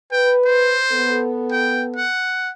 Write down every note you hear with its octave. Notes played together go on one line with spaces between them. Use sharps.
B4 G5
C5
B3 A4
G5
F#5